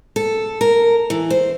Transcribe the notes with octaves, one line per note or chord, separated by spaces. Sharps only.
A4
A#4
E3
C5